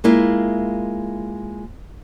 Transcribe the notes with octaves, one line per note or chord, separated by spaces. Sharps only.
G#3 A#3 E4 F4